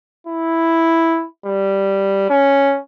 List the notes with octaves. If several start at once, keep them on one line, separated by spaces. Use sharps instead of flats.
E4
G3
C#4